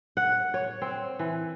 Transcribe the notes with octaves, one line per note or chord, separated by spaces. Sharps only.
F#5
C#5
C4
E3